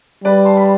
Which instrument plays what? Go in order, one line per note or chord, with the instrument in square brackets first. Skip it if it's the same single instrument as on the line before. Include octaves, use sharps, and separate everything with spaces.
[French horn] G3 [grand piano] B4 D5
[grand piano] A5 C6
B5